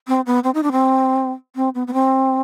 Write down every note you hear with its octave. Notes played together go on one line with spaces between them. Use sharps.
C4
B3
C4
D#4
D4
C4
C4
B3
B3
C4